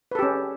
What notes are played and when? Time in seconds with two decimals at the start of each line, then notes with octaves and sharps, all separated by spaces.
0.11 B4
0.15 A4
0.19 G4
0.23 C#4